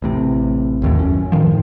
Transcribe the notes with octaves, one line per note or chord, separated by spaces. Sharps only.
A1 A2 C3
G1 D#2 A2
F#2 C#4
A2 D#3 F3